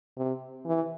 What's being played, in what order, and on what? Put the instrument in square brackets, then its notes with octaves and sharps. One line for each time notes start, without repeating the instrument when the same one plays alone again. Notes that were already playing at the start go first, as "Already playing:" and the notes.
[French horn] C3
E3